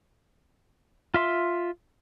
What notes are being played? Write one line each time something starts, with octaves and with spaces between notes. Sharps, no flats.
F4 E5 C6